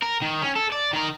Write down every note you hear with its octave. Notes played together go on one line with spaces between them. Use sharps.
A#4
D#3
C#4
A4
D5
D#3 A#4